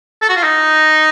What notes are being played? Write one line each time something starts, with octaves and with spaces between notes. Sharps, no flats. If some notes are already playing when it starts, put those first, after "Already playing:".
A4
F#4
F4
D#4